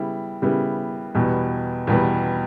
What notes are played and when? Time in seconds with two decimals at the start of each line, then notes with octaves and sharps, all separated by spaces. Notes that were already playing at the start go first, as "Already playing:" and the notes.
Already playing: C#3 G3 B3 E4
0.42 C#3 G3 B3 E4
1.15 E2 B2 G3 B3
1.87 E2 B2 G3 B3